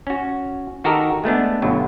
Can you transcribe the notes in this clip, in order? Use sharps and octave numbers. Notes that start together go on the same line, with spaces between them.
C#4 F#4
D#3 F#4 G4 A4 A#4 D#5
G#3 A3 B3 D4
G1 G2 B2 F#3